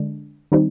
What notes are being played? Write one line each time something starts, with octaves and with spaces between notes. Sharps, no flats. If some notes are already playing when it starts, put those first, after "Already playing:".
Already playing: D3 G#3 D4
D#3 G3 C4 D#4